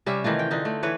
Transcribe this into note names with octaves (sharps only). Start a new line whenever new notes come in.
C3 G3 C#4 E5
D#3 E3 A3 F4
G5
D3 D#4 F4
A3
E3 B4 C#5